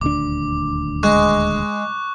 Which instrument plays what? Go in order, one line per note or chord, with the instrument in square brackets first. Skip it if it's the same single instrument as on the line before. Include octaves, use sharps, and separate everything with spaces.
[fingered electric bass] D#1 D2 D4 [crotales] D6
[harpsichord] G#3 [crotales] C#6 F#6